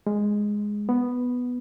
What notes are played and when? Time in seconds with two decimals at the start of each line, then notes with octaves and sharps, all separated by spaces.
0.07 G#3
0.89 B3